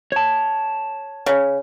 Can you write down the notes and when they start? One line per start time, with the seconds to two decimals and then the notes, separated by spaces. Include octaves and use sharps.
0.12 C#5 A5
1.26 C#3